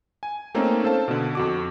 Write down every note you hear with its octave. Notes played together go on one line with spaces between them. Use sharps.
G#5
A3 A#3 C4 C#4 D#4
A4 C5 F5 A5
B2 D3
F2 F#4 D6